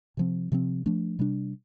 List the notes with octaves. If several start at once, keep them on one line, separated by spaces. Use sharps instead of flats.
C3 F3 C4
C3 F3 C4
F3 A3 D4
C3 G3 D4